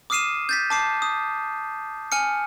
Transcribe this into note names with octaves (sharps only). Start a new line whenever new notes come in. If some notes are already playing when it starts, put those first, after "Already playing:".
D6 D#6 F6 C7 D#7 E7
G6 A6 B6
A5 D6 C7
D#6
G#5 F6 C#7